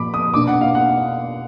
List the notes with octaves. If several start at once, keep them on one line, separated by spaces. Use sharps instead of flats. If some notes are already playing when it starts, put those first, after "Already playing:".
Already playing: A#2 F3 A#3 B5 D6
D#6
B2 A#3 D4 D6
F#5
F5
F#5